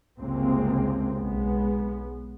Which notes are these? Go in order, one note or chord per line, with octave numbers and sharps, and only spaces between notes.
G1 C#2 C3 G#3 A#3 C4
B1 G#3 B3